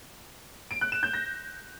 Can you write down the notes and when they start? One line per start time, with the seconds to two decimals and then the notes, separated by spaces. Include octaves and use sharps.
0.71 D7
0.81 F#6
0.92 E7
1.03 G6
1.13 A#6